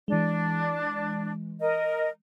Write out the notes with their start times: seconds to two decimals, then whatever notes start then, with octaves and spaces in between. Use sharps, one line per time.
0.08 E3 G#3 D4
1.60 A#4 D#5